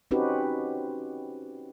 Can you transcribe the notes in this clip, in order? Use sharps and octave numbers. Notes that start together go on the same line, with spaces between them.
C4 C#4 D#4 F#4 G4 B4